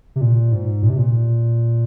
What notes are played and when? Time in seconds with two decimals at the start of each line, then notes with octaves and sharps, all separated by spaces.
0.16 C3
0.21 A#2
0.52 G#2
0.83 A#2
0.90 C3
0.98 A#2